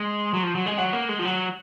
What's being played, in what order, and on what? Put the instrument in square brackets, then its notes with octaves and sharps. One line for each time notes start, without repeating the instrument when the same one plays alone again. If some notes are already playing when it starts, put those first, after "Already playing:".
Already playing: [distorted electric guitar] G#3 [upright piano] C6
[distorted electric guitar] F#3
F3
F#3
G#3
[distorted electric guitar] F#3 [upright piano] F#5
[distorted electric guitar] A#3
G#3
F3
F#3